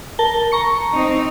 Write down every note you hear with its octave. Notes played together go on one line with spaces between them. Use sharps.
A#4 A5 G7
A#5 C#6 C#7
C4 D#4